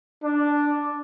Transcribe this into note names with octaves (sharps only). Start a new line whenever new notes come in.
D4